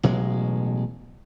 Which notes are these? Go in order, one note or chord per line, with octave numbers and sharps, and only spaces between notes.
A1 B2 F#3 G#3